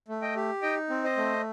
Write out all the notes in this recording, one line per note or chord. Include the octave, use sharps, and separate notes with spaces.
A3
D#5 G5
G4
D#4 D#5 G5
C4
C5 D#5
A3